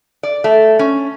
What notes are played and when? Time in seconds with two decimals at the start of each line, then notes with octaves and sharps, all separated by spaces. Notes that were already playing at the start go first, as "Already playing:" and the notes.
0.23 D5
0.44 A3
0.79 C#4